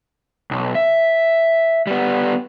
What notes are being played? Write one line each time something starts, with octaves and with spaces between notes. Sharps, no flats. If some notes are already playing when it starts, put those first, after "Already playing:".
B1
E5
G3 B3